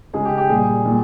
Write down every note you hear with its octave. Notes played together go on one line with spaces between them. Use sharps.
C#3 G#3 G#4
G4
G4
A#2 G3 G#4
A#2 G3